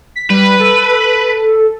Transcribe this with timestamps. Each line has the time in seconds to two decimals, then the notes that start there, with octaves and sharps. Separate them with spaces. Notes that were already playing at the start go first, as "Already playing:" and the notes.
0.16 B6
0.30 G3 B4
0.60 A4